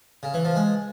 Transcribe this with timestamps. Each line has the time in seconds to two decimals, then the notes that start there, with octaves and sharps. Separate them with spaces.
0.23 C#3
0.34 E3
0.45 F3
0.55 G#3